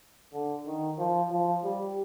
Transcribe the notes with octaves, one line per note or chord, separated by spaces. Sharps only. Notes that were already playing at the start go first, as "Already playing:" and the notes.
D3
D#3
F3
F3
G3